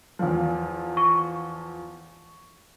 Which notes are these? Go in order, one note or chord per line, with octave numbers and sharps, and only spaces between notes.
E2 F3
C#6